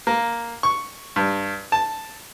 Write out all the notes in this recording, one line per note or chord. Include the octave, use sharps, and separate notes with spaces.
A#3
C#6
G2
A5